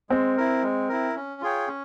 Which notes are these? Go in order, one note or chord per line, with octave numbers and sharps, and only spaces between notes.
G#3 C4
E4 A#4
G#3
E4 A#4
C#4
F4 G#4 C#5 G5
C#4